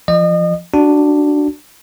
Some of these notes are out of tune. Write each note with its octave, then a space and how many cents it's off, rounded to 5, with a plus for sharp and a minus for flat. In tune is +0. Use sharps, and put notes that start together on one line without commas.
F3 -20 D#5 -35
D4 +5 F#4 +10